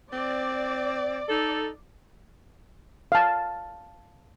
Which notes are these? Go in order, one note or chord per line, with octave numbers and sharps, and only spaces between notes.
C4 D5
D#4 A4
F5 A5